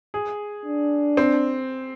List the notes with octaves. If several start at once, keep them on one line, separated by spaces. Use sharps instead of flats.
G#4
D4
C4